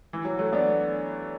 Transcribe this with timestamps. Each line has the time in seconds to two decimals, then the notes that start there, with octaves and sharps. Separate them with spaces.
0.13 E3
0.25 F#3
0.39 F#3 A3
0.53 B3 D4